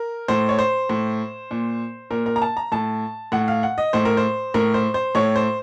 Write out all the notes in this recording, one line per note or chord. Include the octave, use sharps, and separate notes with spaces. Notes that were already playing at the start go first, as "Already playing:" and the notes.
Already playing: A#4
A2 C5
C#5
C5
A2
A#2
A#2 A#4
A#4
A#5
A5
A#5
A2 A5
A2 F#5
F5
F#5
D#5
A2 C5
A#4
C5
A2 A#4
C5
C5
A2 C#5
C5